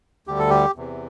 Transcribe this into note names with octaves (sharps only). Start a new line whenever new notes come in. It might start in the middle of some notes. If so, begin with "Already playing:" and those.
D2 D3 G3 G4
A4
G4
E2 C3 E3